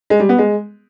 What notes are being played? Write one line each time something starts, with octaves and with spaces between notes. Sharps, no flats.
G#3
G3
B3
G#3